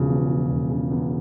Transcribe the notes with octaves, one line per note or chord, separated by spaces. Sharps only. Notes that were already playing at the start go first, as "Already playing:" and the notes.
Already playing: E1 C#3 F3
E2
F3
E1
C#3
E2